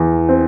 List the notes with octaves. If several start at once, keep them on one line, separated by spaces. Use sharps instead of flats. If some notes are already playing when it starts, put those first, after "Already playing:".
Already playing: E2
C4